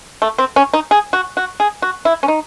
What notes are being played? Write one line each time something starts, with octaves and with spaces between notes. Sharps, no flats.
A3
C4
C#4
D#4
G#4
F#4
F#4
G#4
F#4
E4
C#4
D#4